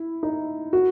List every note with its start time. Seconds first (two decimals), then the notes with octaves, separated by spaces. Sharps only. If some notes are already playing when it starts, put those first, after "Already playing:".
Already playing: E4
0.23 D#4
0.73 F#4